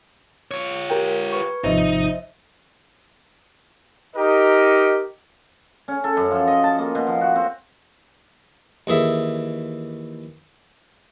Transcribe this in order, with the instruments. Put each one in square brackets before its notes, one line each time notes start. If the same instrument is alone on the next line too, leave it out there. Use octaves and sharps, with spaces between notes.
[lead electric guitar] F4 C#5
[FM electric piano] G4 A#4 G5
[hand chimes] B4 C#6 G#6
[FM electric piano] G#1 C3 F3 [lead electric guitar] D#4 [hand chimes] C5 D#5 E5
[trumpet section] D#4 G4 A#4 D#5
[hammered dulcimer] C#4
A4
F#2
F3
D#5
A5
A#3
B2
F3
F#4
C4
[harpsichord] D#2 E3 G#4 E5